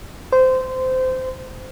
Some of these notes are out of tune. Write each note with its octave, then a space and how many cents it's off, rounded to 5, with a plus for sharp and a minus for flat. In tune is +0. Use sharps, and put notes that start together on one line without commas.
C5 -20